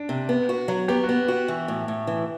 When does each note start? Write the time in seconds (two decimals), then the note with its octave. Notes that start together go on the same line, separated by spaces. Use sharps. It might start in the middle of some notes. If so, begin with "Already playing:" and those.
Already playing: D4
0.09 C3
0.29 B3
0.49 F#4
0.68 F#3
0.88 B3 G4
1.04 F#4
1.09 B3
1.28 F#4
1.48 E3
1.68 A2
1.88 A2
2.07 E3